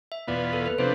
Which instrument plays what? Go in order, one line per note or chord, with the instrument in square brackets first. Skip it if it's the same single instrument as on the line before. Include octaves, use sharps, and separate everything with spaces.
[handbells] E5
[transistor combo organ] E2 B2 B3 F4 [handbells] D5
[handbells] A4
B4
[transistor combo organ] C3 F3 B3 D4 [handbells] C5